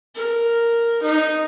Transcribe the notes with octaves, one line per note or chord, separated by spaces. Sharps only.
A#4
D#4